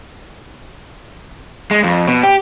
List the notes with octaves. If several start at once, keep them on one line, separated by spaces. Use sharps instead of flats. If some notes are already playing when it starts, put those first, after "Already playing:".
G#3
F2
B2
G4